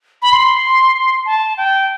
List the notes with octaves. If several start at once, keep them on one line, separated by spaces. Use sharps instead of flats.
B5
C6
A5
G5